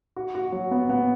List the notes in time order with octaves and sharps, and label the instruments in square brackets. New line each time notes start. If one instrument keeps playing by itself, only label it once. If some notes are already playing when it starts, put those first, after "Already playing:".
[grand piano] F#4
F#4
F#3
B3
B3